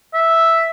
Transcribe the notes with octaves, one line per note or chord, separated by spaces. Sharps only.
E5